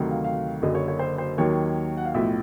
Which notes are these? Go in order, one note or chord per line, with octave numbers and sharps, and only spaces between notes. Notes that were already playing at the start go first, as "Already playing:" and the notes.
Already playing: D2 C3 D#3 F#3
F5
F5
F#1 F#2 D3 D#5
C#5
C#5
C5
C5
D#2 D#3 F#3 C#5
F#5
F5
B1 A2 F3 E5